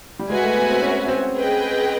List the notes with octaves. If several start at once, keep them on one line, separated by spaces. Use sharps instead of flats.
G3
G#3 F#4 B4 E5 G#5
A3
B3
C4
C#4
C4
G#4 B4 D#5 G5